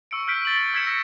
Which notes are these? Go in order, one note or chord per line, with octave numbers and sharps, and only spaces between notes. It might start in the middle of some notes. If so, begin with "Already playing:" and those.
C#6 E6 C#7 D7
E6 F6 G6 B6 D7
A6 F#7
F#7
E6 G#6 B6 C#7 E7
E6 A#6 C#7